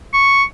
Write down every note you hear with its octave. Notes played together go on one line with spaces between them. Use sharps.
C#6